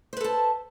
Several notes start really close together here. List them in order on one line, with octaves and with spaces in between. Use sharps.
C5 B4 A4 A5